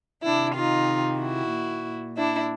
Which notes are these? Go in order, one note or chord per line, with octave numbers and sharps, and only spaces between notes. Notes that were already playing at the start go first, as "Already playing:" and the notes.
C3 D#3 D4 E4
D#4 F4
E4 F#4
A#2
D4 E4